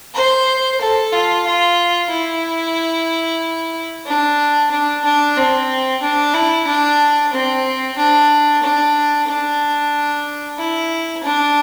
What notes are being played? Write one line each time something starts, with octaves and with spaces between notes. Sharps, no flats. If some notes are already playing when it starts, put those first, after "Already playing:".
C5
A4
F4
F4
E4
D4
D4
D4
C4
D4
E4
D4
C4
D4
D4
D4
E4
D4